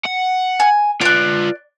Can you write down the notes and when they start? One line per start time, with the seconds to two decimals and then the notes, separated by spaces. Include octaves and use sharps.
0.05 F#5
0.60 G#5
1.01 F4 B4 D5 F#6